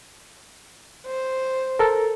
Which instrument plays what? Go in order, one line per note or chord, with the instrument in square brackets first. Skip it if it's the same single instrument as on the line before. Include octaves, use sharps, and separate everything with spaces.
[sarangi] C5
[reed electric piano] A4 A#4